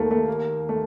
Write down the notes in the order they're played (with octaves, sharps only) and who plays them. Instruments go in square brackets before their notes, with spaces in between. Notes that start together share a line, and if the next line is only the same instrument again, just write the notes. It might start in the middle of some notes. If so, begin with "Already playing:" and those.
Already playing: [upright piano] D#2 [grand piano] A3 A#3
[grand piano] A3
A#3
A3